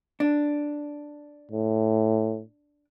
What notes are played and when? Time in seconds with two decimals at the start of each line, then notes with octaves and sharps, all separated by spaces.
0.20 D4
1.52 A2